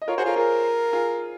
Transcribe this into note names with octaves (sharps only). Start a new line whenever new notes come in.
D#5
F4 A#4 C#5
F#4 G#4 C5
F4 A#4 C#5
F4 G#4 A#4
F4 G#4